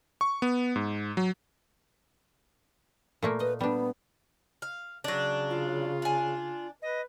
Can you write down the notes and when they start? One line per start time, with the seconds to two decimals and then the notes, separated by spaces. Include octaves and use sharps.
0.21 C#6
0.42 B3
0.76 G#2
1.17 F#3
3.22 A#2 A3 A#3
3.40 B4 D#5
3.61 G3 B3 D4
4.62 F5
5.04 C#3 F#3 D4
5.50 F4
6.02 D4 G#5
6.82 B4 D#5